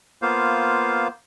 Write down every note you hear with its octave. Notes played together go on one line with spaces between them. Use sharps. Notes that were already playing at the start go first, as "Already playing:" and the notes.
A#3 B3 F4 C5 F5